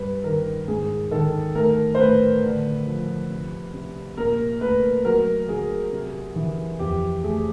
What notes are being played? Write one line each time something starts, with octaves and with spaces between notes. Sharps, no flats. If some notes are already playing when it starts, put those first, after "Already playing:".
Already playing: G2 B4
D#3 A#4
G#2 G#4
D#3 A4
A3 A#4
C5
A2 B4
D3
F3
C3
C3
A#2 A#4
A3 B4
F#3 A#4
F#3 G#4
C3
E3
F2 G4
A3 G#4